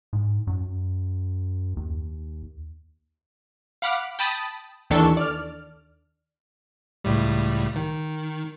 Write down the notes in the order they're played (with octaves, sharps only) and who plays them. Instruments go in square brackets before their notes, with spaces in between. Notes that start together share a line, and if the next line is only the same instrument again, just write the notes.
[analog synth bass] G#2
F#2
D#2
[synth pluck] F5 F#5 B5 D6 F6
G5 A5 B5 D#6 A6
D#2 D#3 E3 D4 A4 C#6
D5 F6
[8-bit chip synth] C#2 A2 G3
D#3